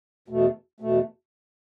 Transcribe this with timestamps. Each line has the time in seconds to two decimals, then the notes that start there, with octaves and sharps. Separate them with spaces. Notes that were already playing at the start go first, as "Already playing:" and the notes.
0.28 E2 B2 A3
0.80 E2 B2 A3